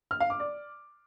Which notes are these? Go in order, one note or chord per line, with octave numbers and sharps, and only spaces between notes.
F6
F5
D6
D5